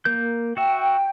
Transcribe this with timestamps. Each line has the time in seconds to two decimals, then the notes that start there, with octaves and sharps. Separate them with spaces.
0.05 A#3 A#4 G6
0.57 F#4 E5 G5